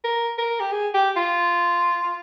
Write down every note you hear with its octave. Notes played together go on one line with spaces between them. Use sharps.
A#4
A#4
G4
G#4
G4
F4